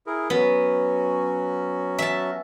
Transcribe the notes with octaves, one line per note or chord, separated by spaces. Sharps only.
E4 G#4 A#4
F#3 B3 C#4 F#4
E5 A5